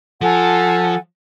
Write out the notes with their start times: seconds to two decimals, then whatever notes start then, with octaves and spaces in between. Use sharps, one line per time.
0.21 F3 A4 F#5 G#5